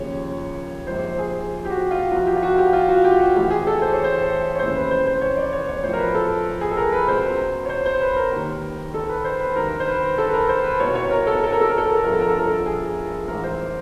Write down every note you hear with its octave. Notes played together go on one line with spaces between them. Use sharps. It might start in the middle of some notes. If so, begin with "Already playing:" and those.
Already playing: D#2 C#3 F3 C#5
A#1 G#2 F3 C5
G#4
G4
F#4
F4
C2 C3 F3 F#4
G4
F4
F#4
G4
F4
F#4
G4
F#4
A1 A2 E3 G4
G#4
A4
C5
C#5
C5
C#5
F1 D#2 C#3 E3 C5
B4
C5
C5
C#5
D5
C#5
C#5
B1 A2 F3 C5
A#4
B4
A4
G#4
A4
A#4
B4
C#2 B2 C5
C#5
C5
C5
B4
A#4
D#2 D#3
A4
B4
C5
B4
G#1 G2 D#3 A#4
C5
B4
A4
B4
A#4
C5
B4
C2 B2 C#5
C#5
A#4
A4
A#4
A4
A#4
A4
A#4
A4
A#4
A4
G1 G2 D3 F3 A#4
A4
A#4
A4
A#4
A4
G#4
A1 G#2 E3 A#4
C5